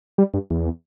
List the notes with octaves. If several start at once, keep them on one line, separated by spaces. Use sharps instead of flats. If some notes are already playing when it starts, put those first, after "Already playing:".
G3
G2
E2